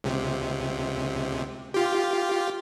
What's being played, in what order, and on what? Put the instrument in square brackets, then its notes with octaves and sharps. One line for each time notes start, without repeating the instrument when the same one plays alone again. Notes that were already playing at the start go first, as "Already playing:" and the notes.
[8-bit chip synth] C#2 C3
F4 G4